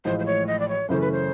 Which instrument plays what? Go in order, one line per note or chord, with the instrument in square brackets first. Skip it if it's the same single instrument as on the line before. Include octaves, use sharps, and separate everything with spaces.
[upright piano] A1 A2 F3 G#3 [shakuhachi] C5
[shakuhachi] C5
C#5
D#5
D5
C#5
[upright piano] F#2 C#3 E3 A3 C#4 [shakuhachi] C5
[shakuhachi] B4
C5